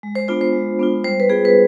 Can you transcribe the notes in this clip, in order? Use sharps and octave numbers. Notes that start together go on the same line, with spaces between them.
G#3
C5
B3 D4 F4 C5
C5
G#3
B3 D4 F4
G3 C5
B4
B3 F4 G#4
B4